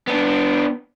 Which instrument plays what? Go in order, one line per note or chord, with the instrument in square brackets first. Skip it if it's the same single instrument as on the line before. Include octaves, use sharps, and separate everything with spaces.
[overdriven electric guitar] B3 D4